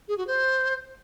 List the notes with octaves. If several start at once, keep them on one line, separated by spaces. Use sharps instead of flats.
G#4
F#4
C5